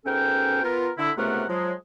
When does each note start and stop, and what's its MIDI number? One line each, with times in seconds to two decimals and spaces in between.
0.06 0.61 44
0.06 0.61 47
0.06 0.61 61
0.06 0.61 69
0.06 0.61 70
0.06 0.61 79
0.63 0.89 59
0.63 0.89 65
0.63 0.89 70
0.98 1.11 50
0.98 1.11 64
1.18 1.44 37
1.18 1.44 48
1.18 1.44 57
1.18 1.44 59
1.18 1.44 70
1.18 1.44 78
1.49 1.73 53
1.49 1.73 54
1.49 1.73 56